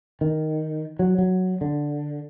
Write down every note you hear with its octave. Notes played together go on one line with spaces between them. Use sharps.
D#3
F#3
F#3
D3